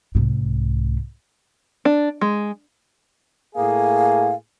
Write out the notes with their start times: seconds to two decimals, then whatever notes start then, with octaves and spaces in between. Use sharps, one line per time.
0.15 C2 G#2
1.85 D4
2.21 G#3
3.55 A2 A#3 G#4 F5